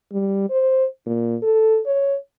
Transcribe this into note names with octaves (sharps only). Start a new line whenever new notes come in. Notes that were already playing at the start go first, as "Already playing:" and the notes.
G3
C5
A#2
A4
C#5